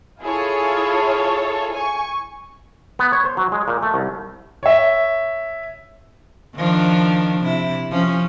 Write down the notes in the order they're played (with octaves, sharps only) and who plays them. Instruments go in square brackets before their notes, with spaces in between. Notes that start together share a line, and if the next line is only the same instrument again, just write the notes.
[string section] E4 F4 G#4 A4 C#5
G#5 C#6
[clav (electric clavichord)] B3
C#5
C5
F#3
G#3
A#2
A3
C2
[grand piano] C#5 E5
[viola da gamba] D#3 F3 D4
C3 E4
F3 C#4